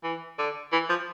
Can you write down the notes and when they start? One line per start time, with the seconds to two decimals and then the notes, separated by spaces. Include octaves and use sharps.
0.03 E3
0.38 D3
0.72 E3
0.89 F3